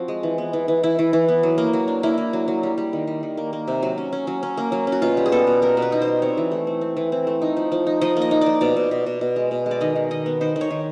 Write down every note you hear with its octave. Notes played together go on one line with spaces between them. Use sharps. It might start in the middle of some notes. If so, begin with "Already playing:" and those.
Already playing: F3 C4 F#4
G#3
E3
B3
E3
E3
E3 E4
E3
E3
B3
F#3
A#3
F#3
D4
A#3 E4
A#3
F#3
F#3
G3
G3
D#3
G3
D#3
A#3
A#3
C3
F#3
C#4
C#4
F#3
C#4
A#3
F#3
C#4
F#4
B2 F4
G3
G#4
B3 A4
B2
B3 A#4
B2
B4
D#4
C5
G3
C4 C#5
E3
A3
C4
C4
E3
C4
A3
D#4
F3
F3
D#4
F3 D#5
A#3
D#5
D#4
F3 D5
B2 D5
B2
B2
B2
B2
G#3
B2
G#3
D5
D#3 D#5
D#3
D#3 D#5
B3
D#3 C5
D#3
C#5
D#3